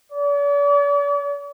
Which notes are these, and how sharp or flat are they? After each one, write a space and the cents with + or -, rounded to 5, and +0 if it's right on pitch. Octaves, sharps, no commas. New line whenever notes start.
D5 -45